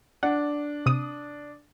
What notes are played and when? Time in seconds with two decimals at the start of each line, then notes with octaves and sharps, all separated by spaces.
0.23 D4 F#5
0.86 C3 D#6